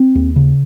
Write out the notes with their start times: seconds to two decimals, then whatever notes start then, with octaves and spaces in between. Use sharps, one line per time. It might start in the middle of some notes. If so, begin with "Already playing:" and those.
Already playing: C4
0.15 D#2
0.36 C#3